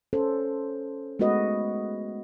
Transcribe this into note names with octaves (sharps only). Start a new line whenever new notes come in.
C#4 A4 C5
G#3 A3 B3 F#4 B4 D#5